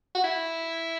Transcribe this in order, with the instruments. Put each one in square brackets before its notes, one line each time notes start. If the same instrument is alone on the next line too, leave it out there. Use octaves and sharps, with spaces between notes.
[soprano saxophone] F#4
E4